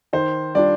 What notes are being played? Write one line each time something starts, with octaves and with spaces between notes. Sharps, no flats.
D#3 C5
G3 D4 F4 D5